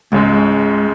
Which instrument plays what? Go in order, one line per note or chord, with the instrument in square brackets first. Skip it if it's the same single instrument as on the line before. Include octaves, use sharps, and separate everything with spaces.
[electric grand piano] C#2 C#3 G#3 [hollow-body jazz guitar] G#2